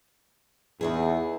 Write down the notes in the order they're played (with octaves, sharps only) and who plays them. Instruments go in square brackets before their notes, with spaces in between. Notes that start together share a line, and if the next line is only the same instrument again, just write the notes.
[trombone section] E2 [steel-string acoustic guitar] D#4 E4 G#4